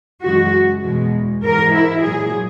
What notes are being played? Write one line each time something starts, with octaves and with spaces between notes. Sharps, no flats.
F#2 C#3 E3 G#3 F#4
E2 B2 G#3
G#2 E3 G#3 A#4
E4
A#2 F#3 G#4